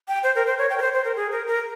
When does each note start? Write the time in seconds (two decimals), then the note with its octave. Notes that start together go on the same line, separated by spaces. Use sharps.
0.08 G5
0.23 C5
0.35 A#4
0.47 C5
0.58 C#5
0.70 G5
0.78 A#4
0.82 C5
0.93 C5
1.04 A#4
1.16 G#4
1.32 A#4
1.47 A#4